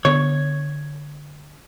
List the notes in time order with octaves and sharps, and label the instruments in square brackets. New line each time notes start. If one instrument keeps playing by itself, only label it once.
[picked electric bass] D3 B3 [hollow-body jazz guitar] C#5